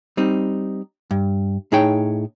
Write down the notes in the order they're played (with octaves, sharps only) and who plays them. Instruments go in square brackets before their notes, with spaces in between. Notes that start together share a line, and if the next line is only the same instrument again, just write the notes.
[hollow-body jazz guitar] G3 C4 D#4
G2
A2 D#4 G#4 C#5 G5